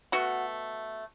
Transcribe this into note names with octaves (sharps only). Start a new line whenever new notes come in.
B2 A3 F#4